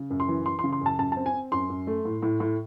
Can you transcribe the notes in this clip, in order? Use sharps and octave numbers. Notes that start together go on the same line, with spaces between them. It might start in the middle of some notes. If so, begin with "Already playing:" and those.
Already playing: C#3
F#2
C6
E3
E3 C6
C6
C#3
C6
F#2 A5
F#2 A5
C4 A5
G#5
C4
F#2 C6
F#2
A3
A2
A2
A2